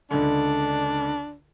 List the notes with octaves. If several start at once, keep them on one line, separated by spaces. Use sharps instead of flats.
C#2 D3 D4